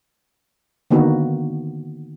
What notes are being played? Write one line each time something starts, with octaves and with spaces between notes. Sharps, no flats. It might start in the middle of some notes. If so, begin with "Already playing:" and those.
D3 D#3 A#3 B3 D#4 F#4